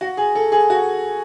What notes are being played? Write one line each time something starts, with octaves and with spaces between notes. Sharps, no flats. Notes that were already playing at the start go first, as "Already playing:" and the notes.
F#4
G#4
A4
G#4
F#4